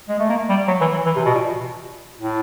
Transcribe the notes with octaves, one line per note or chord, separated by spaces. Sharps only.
G#3
A3
A#3
G3
F#3
E3
E3
E3
C3
B2
A#2
A2